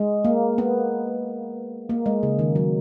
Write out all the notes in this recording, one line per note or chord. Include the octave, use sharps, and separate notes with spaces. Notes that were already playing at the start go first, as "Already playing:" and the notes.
Already playing: G#3
A#3
B3
A#3
G#3
C#3
D#3
F#3